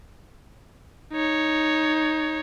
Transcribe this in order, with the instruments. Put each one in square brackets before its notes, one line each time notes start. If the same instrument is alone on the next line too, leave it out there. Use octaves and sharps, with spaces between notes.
[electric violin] D#4 C#5